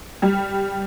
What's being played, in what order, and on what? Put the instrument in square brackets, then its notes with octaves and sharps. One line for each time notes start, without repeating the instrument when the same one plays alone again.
[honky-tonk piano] G3